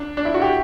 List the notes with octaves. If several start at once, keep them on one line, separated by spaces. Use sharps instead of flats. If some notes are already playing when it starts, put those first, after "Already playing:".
Already playing: D4
D4
E4
F#4
G4